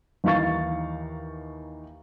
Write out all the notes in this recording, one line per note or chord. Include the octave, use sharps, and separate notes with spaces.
D#2 E3 D#4 F5 C#6 A6